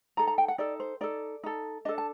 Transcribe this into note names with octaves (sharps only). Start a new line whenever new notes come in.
D#4 A4 A#5
A#5
G5
F#5
D#4 A4 D5
C5
D#4 A4 D5
D#4 A4
D4 A4 D#5
A5